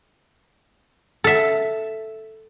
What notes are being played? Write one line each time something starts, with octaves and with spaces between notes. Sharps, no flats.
A4 E5